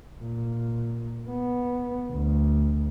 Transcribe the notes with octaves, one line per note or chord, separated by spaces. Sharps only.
A#2
B3
D2